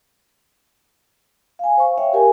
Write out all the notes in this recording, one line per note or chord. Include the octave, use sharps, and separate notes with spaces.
F5 G#5
C5 F5 C#6
C#5 E5 F5 G5
G4 A#4 G#5